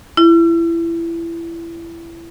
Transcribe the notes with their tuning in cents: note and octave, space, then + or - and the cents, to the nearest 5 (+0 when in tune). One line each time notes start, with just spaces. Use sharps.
E4 +25